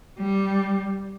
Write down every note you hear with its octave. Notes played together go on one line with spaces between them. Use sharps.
G3